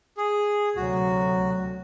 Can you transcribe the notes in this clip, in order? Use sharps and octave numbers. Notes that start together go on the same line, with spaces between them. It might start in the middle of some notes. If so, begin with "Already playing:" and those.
G#4
D2 C3 F#3 F#4